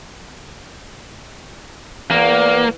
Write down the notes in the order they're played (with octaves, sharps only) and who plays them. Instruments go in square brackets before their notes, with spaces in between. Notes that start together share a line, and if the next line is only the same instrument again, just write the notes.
[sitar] E2 [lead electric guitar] A#3